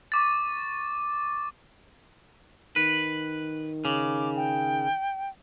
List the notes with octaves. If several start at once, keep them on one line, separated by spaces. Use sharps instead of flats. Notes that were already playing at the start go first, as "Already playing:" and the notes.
C#6 D6 A6
D#3 B4
C#3 D6
G5